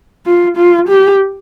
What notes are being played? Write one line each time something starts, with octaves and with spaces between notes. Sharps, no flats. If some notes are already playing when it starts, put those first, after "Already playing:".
F4
F4
G4